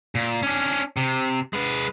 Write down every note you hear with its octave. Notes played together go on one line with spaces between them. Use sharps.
A#2
C#4 D4
C3
G#3 B4